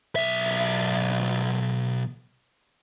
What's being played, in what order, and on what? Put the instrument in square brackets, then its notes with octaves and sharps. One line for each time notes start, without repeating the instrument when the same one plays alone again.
[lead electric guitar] B1 E5